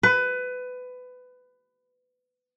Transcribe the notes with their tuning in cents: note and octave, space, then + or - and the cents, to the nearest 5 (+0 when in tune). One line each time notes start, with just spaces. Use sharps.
B4 +20